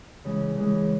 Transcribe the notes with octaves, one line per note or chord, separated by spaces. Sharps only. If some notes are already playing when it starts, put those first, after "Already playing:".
C#3 E3 G#3
C#3 E3 G#3